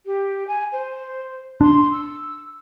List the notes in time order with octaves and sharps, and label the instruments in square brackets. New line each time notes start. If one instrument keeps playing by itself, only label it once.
[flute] G4
G#5
C5
[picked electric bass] D4 [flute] C6
[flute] E6